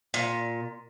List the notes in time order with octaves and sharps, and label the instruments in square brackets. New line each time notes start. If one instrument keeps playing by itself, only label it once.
[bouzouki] A#2